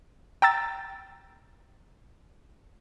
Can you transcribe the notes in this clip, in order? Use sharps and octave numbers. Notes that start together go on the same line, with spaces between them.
G5 A#5 E6 A6